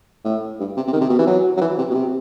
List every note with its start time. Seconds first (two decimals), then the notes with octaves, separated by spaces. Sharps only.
0.25 A2
0.60 G2
0.77 C3
0.88 C3
0.93 D#3
1.01 C3
1.10 B2
1.19 E3
1.27 F#3
1.57 F#3
1.61 E3
1.78 C3
1.90 B2
1.94 C3